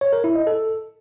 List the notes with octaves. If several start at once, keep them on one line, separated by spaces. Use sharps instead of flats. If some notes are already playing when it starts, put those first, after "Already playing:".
C#5
A#4
E4
D#5
A4